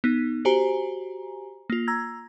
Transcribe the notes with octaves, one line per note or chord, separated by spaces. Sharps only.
B3 D#4
F#4 G4 C5 G#5 A#5
A#3 F4
A#5 E6 G#6 A#6